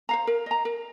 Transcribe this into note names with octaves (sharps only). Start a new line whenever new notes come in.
C5 F5 A#5
A#4
D#5 A#5
A#4